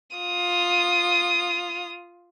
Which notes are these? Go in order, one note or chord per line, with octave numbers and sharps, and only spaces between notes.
F4 D#6